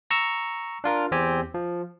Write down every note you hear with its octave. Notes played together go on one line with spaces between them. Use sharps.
A#5 C#6 E6
D4 F4 A#4
E2 C4 G4 G#5
F3